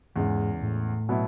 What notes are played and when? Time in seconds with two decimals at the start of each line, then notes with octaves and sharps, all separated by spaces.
0.16 E2 G#2 C#3 G#3
0.62 A2
1.09 B2 F#3 B3 E4